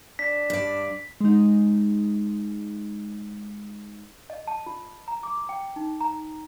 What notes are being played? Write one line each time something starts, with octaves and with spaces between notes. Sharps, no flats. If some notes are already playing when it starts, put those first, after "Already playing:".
D4 B6
G2 D5
G#3 D#4
D#5
A5
F4
A#5
D6
G5
D#4
A#5